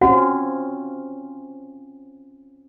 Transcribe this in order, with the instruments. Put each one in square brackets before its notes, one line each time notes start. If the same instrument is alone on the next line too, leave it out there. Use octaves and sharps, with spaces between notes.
[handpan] C4 C#4 F4 [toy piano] F#4 F#5